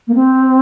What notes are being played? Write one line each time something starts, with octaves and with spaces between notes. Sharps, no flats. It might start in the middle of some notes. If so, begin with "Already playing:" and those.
A#3
C4